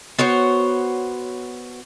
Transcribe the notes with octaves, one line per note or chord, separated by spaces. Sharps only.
B3 F#4 C5 C#5